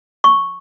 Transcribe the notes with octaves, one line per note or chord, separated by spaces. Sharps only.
C#6